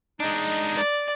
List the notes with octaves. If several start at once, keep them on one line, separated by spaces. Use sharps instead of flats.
G#3 D4 D#4
D5